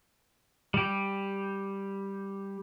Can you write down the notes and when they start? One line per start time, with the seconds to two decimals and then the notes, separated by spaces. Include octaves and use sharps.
0.74 G3 G4